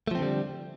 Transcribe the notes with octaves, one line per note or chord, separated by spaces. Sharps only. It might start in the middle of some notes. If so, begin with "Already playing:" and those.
D3 F3 G3 A3 C4